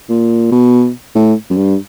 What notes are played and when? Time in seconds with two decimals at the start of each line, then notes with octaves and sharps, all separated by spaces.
0.10 A#2
0.52 B2
1.15 A2
1.50 F#2
1.57 G2